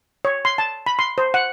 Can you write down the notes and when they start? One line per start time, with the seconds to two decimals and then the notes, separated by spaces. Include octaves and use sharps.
0.25 C#5
0.45 C6
0.58 A5
0.86 B5
0.99 C6
1.18 C5
1.34 F#5